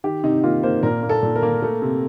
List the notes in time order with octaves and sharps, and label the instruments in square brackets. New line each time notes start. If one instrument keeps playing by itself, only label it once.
[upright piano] D#3 G4
C3 D#4
A#3 F4
A#3 C5
A#2 A#4
A#3
A4
A#2
A#4
A#3
A3
C3